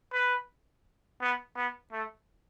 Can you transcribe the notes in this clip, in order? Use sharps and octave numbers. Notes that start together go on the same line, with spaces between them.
B4
B3
B3
A3